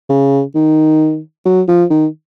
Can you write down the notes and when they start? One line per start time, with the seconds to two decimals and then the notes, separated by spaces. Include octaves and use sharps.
0.10 C#3
0.55 D#3
1.46 F#3
1.69 F3
1.91 D#3